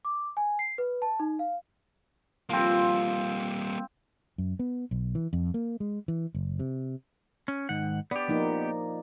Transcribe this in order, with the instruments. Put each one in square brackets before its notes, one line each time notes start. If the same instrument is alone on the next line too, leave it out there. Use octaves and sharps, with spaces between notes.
[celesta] D6
G#5
C7
B4
A5
D#4
F5
[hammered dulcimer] F3 C4 [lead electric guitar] G3 A#3
[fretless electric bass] F#2
B3
B1
E3
F2
A#3
G#3
E3
F#1
C3
[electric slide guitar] C#4
G#2 D#3 F#5
[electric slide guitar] B3 G4 [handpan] D5
[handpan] F3 A#3 D#4